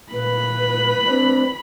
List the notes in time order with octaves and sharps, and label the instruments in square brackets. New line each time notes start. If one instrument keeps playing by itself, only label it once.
[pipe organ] A#2 [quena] B4 [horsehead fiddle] B5
[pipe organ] C4 D4